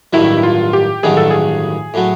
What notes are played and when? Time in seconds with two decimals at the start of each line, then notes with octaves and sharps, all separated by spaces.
0.13 A1 G2 D#3 F#3 A3 E4
0.38 E4
0.43 F4
0.73 G4
1.03 A1 G2 D#3 F#3 A3 G#4
1.17 A4
1.30 G#4
1.94 A2 F#3 A3